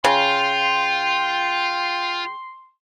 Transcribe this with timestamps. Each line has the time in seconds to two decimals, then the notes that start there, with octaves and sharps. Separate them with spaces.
0.04 C#3 F4 G5 C6